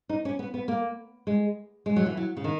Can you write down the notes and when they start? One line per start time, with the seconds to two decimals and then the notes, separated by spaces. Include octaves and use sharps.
0.09 D#4
0.25 C#4
0.39 B3
0.54 B3
0.68 A#3
1.27 G#3
1.86 G#3
1.96 F#3
2.06 E3
2.17 F#3
2.37 C#3
2.44 D#3